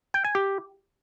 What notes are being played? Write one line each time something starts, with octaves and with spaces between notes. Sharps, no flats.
G5
G#5
G4